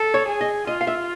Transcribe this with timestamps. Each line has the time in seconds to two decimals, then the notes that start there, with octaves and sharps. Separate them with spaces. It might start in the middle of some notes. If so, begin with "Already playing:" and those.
Already playing: A4
0.14 C#5
0.28 G#4
0.41 D#5
0.67 F4 D#5
0.81 F5
0.87 E5